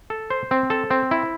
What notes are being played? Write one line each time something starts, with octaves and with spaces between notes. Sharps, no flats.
A4
C5
C4
A4
C4
E4